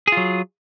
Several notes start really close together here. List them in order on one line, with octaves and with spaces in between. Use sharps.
G#4 F4 F#3